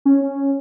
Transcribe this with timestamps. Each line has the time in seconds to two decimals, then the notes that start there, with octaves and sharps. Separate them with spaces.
0.05 C#4